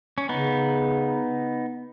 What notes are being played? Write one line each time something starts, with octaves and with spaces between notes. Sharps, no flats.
C#4
C#3 B3 D#4